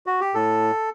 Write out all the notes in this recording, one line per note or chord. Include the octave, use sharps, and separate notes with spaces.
F#4
G4
A2 A4